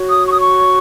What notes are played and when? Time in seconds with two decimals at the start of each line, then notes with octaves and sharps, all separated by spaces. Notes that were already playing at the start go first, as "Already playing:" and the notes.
Already playing: F#4 C#5
0.09 D#6
0.27 C#6
0.33 D#6
0.40 C#6